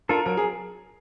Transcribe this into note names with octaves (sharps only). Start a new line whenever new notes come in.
D4 F4 A4 A#4
F#3 A#4
G#4